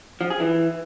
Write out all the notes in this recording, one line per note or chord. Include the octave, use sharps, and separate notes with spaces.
F3
G#4
E3